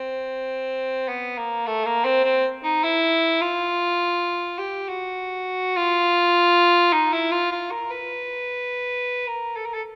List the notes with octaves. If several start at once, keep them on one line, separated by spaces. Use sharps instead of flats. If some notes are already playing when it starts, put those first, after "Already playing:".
Already playing: C4
B3
A#3
A3
A#3
C4
C4
D#4
E4
F4
G4
F#4
F4
D#4
E4
F4
F4
A#4
B4
A#4
A4
A#4
A4